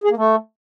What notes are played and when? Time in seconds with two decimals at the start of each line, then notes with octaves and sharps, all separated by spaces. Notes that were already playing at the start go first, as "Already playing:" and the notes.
0.04 G#4
0.10 A#3
0.17 A3